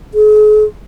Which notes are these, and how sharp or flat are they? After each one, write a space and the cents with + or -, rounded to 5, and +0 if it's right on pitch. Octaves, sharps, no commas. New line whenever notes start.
G#4 +40